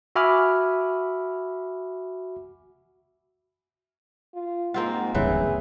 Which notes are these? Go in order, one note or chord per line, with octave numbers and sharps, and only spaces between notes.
F#4 E5 G#5 B5 D6 F6
F4
G#2 A#3 C4 F4 F#5
D1 C#2 G2 E3 G#4 C#5